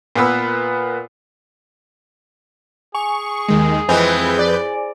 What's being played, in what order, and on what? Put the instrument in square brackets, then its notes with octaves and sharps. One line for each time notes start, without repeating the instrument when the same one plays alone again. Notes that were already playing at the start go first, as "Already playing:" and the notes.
[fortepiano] A#2 A#3 B3 B4 E6
[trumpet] G#4 [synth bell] G#5 [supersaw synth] C#6
[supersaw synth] D#2 D#3 G#3
[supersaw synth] F2 B4 G6 [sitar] E3 G#3 C4 [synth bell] C5 G#5
[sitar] D5